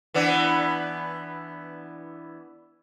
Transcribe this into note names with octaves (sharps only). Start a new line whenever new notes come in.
E3 B3 D4